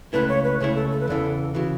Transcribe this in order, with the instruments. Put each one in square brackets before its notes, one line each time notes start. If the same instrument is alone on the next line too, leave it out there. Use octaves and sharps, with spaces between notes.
[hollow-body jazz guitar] C#2 C#3 A3 E4 [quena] B4
[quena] C#5
B4
[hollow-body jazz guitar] C#2 C#3 A3 E4 [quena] C#5
[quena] A4
A4
B4
[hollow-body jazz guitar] E2 C#3 E3 [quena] A4
[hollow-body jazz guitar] C#3 E3 [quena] F#4